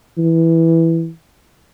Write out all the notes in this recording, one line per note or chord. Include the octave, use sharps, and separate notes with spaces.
E3